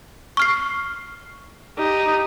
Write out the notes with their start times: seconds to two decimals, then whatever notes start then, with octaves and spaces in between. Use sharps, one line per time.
0.37 C#6 F6 C7
1.78 D#4 G4